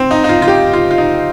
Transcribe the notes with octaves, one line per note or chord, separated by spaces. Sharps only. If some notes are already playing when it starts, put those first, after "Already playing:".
Already playing: C4
D#4
D#4
F4
F4
G4
F4
F4
D#4